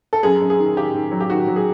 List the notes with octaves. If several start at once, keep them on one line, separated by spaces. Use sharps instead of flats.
A4
F#2 G#4
F#2
G#4
D#3
D#3 G4
D#3
F#3
G4
D#3 F#4
F#3
G#4